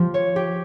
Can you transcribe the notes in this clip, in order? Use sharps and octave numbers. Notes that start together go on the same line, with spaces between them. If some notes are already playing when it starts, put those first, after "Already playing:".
Already playing: F3 G4
C#5
G4